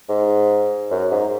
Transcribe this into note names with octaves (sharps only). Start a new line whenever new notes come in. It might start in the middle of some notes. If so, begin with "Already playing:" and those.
G#2
F#2
G#2